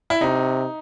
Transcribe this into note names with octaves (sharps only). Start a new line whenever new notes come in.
E4
C3 D#4